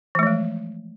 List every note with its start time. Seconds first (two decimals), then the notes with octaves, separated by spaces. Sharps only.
0.15 E3
0.19 A3
0.23 F3
0.27 G#3